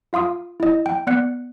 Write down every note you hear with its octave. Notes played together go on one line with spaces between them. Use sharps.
F4 F5 C6 D#6
E4 D#5
G5
B3 D5 F#5 F#6 C#7